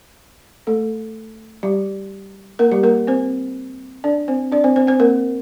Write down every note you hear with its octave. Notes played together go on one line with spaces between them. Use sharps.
A3 A4
G3 G4
A#3 A#4
G3 G4
A#3 A#4
C4 C5
D4 D5
C4 C5
D4 D5
C4 C5
C4 C5
C4 C5
A#3 A#4